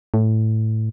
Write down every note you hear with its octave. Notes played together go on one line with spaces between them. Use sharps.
A2